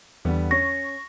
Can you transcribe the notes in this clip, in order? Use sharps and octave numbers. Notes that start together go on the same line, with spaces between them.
E2 D3 G3 B3
C#4 C#6 A#6